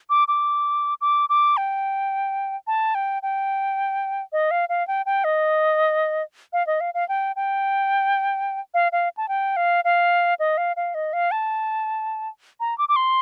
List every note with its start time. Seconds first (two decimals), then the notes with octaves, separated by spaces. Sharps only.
0.10 D6
0.28 D6
1.01 D6
1.29 D6
1.57 G5
2.67 A5
2.95 G5
3.23 G5
4.33 D#5
4.51 F5
4.69 F5
4.88 G5
5.06 G5
5.24 D#5
6.53 F5
6.67 D#5
6.81 F5
6.94 F5
7.09 G5
7.36 G5
8.74 F5
8.92 F5
9.17 A5
9.28 G5
9.57 F5
9.85 F5
10.39 D#5
10.58 F5
10.76 F5
10.95 D#5
11.13 F5
11.31 A5
12.60 A#5
12.78 D6
12.89 D6
12.96 C6